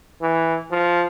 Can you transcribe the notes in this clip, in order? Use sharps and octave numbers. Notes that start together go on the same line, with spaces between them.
E3
F3